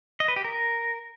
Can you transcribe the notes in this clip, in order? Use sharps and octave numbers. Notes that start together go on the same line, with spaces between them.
D#5
B4
G4
A#4